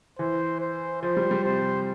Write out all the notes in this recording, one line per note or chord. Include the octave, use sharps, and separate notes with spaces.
E3 C5
C5
F3 C5
G3
G3
C3 C5